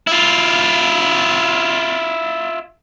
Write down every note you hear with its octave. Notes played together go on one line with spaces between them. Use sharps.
E4 F4